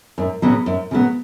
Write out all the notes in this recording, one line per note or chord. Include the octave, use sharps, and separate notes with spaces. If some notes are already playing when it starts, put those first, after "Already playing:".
F#2
C#3 F#3 B3
F#2
C#3 F#3 B3